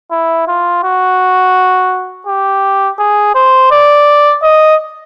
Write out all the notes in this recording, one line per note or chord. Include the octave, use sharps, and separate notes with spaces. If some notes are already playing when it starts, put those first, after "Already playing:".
E4
F4
F#4
G4
G#4
C5
D5
D#5